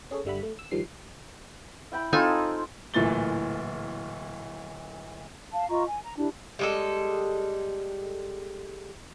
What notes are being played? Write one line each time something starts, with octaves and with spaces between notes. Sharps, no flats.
C#4 G#4 A4 C#5
G1 D3 G3 E5 F#5 B5
A3
E6
G2 D#3 F3 G3 C7
E4 G5 B5
C4 D#4 F4 A4 G#5 B5
D1 A#2 E3 A3 A6 G7
F5 A5
F4 D#5 A#5 C#6
G#5
A#5
D4 E4 G4
G3 G#3 A4